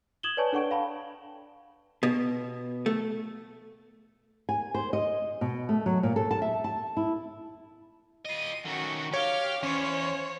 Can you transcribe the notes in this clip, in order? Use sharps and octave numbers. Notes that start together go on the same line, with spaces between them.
D#6 G#6 E7 F#7 G7
B4 C#5 D5 G#5 A5 C#6
D4 A4 F#5 C#6 D7
F5 G5 A5 B5
B2
A3
G#5
C5
D#5
B2
A3
F#3
A#2
A4
A5
E5
A5
E4
F4 D#5 D#7
D#3 A3 C#4 F#4
G4 C#5 F5 F6
E2 C#4 C5 C#5